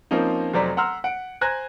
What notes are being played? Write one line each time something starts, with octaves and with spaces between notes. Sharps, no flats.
F3 A#3 C4 C#4 D#4
F1 F#3 C5 D5 A#5 B6
F#5 A#5 C6 E6 F6
F#5 D7
C5 G#5 A#5 F#6 G#6 A#6